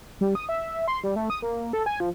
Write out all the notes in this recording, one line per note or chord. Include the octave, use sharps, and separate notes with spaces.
G3
D#6
E5
C6
G3
A3
D#6
A#3
A4
G#5
F3